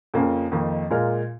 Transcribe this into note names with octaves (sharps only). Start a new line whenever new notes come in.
F2 C#3 F3 A#3 C#4
F2 D#3 A#3 D#4
A#2 G#3 F4 A#4